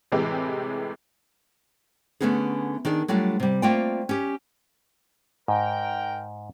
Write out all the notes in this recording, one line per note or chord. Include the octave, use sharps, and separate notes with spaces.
A2 C3 E3 G#3 G4
D3 A3 B3 C#4 D#4 G#4
D#3 D4 G#4 D5
F#3 G3 A3 D4 F4
C3 G3
A3 A#3 C4 F4 D5 G5
C#4 G4
G#2 A#4 G5